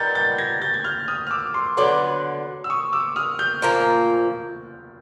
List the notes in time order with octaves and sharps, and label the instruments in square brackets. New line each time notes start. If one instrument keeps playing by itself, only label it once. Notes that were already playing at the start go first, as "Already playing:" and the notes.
Already playing: [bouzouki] A#2 G3 B3 D#4 [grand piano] G6 A6
[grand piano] G6 A6
G#6 A#6
G6 A6
G#6
F6 G6
D#6 F6
F6
D6 E6
C6 D6
[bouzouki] D3 F#3 B3 [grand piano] C6 D6
[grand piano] E6
C#6 D#6
D6 E6
D#6 F6
F6 G6
[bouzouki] A#2 F3 A#3